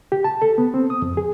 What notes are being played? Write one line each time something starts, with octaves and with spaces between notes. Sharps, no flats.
G4
A5
A4
B3
C4
D#6
F2
G#4